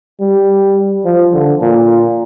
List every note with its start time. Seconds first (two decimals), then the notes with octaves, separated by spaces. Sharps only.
0.20 G3
1.05 F3
1.34 D3
1.61 A#2